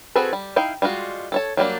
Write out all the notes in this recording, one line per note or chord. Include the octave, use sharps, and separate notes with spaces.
C4 F#4 G#4 A4 B4
G3
D#4 E4 F5 G5
G3 G#3 F4 F#4
A4 C#5 A5
F#3 G3 A#3 D4